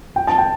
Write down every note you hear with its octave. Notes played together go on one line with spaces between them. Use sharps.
G5
A5
G5